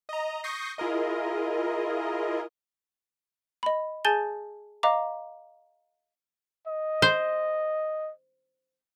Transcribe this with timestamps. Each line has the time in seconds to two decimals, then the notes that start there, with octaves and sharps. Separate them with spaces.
0.09 D#5 A#5
0.44 C#6 D#6 G6 A#6 C7
0.78 E4 F4 G#4 A#4 D#5
3.63 D#5 B5
4.05 G#4 G#5 A5 G6 A6 G7
4.83 D#5 F5 A#5 D6
6.67 D#5
7.02 C5